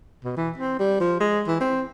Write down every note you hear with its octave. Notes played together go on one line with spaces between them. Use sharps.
B2
E3
C4
G3
F3
G#3
E3
C4